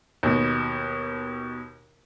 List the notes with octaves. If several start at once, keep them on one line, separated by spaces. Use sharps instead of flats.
D#2 B2